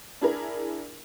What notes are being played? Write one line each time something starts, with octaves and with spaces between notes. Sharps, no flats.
D4 E4 G#4 A#4